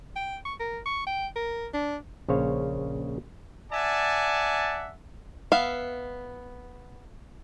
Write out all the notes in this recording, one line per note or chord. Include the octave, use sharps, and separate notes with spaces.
G5
C#6
A#4
C#6
G5
A#4
D4
A#1 C#3 C5 C#5 F5
D5 E5 F#5 G#5 A5
B3 E5 F5